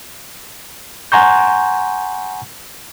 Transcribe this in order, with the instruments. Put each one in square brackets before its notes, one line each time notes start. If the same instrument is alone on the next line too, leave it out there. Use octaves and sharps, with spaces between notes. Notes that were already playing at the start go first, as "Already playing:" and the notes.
[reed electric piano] F#5 G#5 A#5 C6 C#6 G6